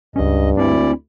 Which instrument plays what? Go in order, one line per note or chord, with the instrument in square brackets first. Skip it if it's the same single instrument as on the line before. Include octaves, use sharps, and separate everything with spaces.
[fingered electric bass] C#2 C#4 [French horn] G2 [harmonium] D#5
[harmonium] D2 E4 D5 [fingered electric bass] C4 D4